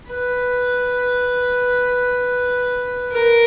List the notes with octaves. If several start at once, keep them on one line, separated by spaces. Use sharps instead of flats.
B4
A#4